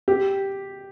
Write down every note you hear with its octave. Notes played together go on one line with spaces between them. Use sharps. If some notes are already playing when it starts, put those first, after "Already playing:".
G4